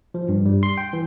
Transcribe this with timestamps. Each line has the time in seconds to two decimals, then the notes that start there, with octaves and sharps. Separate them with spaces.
0.14 F3
0.29 G2
0.46 G3
0.63 C6
0.78 G5
0.93 E3